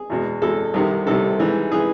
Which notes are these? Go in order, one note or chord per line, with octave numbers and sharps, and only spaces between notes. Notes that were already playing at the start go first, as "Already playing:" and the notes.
Already playing: G#4
E2 B2 G#3
E2 B2 G#3 A4
C2 C3 D#3
C2 C3 D#3 A4
G#2 E3 G#3
E3 G#3 G#4